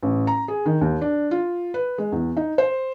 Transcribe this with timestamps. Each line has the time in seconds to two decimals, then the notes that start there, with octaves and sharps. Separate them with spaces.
0.03 A1
0.27 A#5
0.48 G#4
0.66 D#3
0.81 D#2
1.01 D4
1.31 F4
1.74 B4
1.98 G#3
2.12 E2
2.37 D#4
2.58 C5